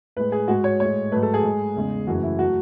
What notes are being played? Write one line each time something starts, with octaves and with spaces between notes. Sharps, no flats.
A2 G#3 B4
G#4
G#2 G#3 F#4
C#5
A2 G#3 C#5
G#2 F#3 A3 B4
A4
G#4
G#2 G#3
E2 C#3 G#3
F#2 C#3 E3 A3 F#4
E4
F#3 A3 F#4